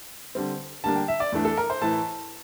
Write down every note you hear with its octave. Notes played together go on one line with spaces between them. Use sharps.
D3 G3 C4
D3 G3 A#3 D4 A5
G5
E5
D5
E2 E3 A3 D4
A4
A#4
C5
A2 E3 A3 A5